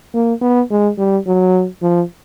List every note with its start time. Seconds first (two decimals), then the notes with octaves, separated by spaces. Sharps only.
0.14 A#3
0.42 B3
0.70 G#3
0.98 G3
1.27 F#3
1.82 F3